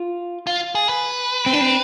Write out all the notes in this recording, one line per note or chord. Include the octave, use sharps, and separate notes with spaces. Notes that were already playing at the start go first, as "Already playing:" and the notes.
Already playing: F4
F4
G#4
B4
C4
D4
C4